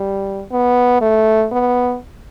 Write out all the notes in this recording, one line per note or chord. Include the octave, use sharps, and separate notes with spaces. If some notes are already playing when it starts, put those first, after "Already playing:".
Already playing: G3
B3
A3
B3